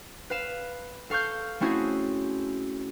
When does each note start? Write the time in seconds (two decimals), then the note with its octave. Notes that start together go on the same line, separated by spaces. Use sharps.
0.30 B4 F5 E7
1.10 A4 F5 C#6 F6 G6
1.60 A3 C4 C#4 E4 F#4 G#4